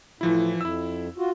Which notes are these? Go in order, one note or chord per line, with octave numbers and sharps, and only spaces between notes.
A2 E3 F3 E4
F2 E4 E6
F4 F#4